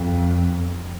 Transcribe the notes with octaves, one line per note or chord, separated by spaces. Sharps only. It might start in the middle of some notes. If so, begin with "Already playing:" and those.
Already playing: F2